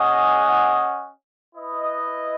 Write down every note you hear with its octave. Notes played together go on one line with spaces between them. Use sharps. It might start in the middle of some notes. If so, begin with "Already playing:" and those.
Already playing: C#4 G#4 D#5 F#5
E4 B4 D#5